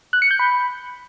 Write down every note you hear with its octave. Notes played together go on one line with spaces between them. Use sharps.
F#6
C#7
G6
B5